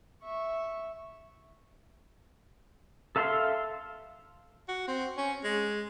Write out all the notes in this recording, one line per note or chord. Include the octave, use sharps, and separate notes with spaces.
E5 C#6
A4 E5 F5 C6
F#4
C4
C#4
G#3